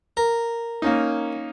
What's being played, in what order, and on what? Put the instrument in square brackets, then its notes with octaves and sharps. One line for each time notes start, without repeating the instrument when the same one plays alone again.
[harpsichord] A#4
[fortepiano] A#3 C#4 D#4